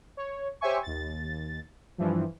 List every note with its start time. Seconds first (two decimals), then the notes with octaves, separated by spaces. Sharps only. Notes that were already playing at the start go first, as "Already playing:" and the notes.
0.17 C#5
0.61 G4 C5 C#5 E5 G#5 C#6
0.83 D#2 A6
1.98 G2 E3 F3